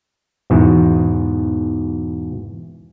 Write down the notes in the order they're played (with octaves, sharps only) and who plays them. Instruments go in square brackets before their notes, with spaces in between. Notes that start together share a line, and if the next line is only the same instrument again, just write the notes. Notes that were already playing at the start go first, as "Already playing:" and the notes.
[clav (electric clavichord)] E2 G#2 B2